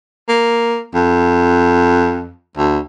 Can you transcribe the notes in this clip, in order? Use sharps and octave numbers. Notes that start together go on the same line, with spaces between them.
A#3
F2
D2